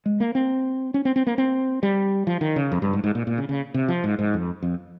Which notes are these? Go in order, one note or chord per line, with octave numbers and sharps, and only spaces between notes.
G#3
A#3
C4
C#4
C4
C4
A#3
C4
G3
F3
D#3
C#3
F2
G2
G#2
G#2
A#2
A#2
C#3
C#3
C3
F3
G#2
G#2
F2
F2